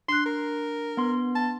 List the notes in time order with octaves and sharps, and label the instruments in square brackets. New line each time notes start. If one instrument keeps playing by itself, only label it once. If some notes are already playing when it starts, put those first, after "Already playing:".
[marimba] D4 F#6 [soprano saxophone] C6
[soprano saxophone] A#4
[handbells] B3 C6
[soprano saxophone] A5